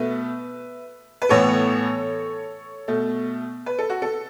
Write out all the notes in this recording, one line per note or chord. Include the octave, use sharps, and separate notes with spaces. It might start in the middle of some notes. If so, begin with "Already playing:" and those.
Already playing: B2 A3 B4 E5
B4
A2 E3 B3 A4 C#5
B2 A3
B4
A4
F#4
A4